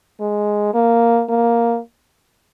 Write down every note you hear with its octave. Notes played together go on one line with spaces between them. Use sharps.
G#3
A#3
A#3